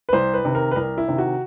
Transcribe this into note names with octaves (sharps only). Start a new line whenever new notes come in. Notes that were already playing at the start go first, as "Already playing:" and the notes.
B4
C2 C5
B4
C3 D#3
A#4
B4
C2 A#4
E4
C3 D#3
F#4